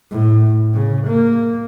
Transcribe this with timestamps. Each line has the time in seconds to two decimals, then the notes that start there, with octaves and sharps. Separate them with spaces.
0.11 A2
0.74 C#3
1.07 A#3